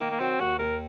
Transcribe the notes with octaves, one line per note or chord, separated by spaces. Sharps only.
D#3 A#3
A#3
F#3 C4
D#2 F#4
D#2 A#4